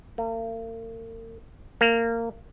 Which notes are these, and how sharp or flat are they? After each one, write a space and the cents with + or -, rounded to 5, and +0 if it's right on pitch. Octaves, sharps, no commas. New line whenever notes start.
A#3 -45
A#3 -20